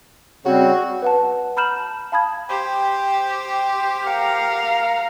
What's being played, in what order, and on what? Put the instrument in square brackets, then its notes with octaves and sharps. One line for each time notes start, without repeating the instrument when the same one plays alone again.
[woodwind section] C#3 G3 C4 [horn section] F#4
[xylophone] B4 F#5 A5
A#5 B5 F6 G6 E7 F#7
A5
F5 A5 B5 D#6 G#6
[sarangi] G4 [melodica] C5 [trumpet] G5
[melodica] A#4 F#5 [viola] F5 A#5